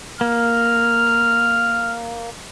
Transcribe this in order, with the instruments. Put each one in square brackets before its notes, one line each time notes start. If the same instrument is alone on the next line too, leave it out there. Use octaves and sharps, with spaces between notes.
[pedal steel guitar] A#3 [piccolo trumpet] F6